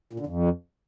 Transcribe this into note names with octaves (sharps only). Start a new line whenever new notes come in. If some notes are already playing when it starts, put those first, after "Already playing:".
A#2
D3
F2